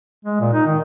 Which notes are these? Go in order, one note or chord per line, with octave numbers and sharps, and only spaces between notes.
G#3
A#2
D#4
D#3